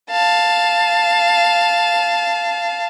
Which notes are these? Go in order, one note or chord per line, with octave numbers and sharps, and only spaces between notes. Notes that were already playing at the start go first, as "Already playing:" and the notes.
F5 A5